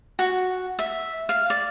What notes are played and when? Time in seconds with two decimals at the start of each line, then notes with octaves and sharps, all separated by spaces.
0.19 F#4
0.79 E5
1.29 F5
1.50 D5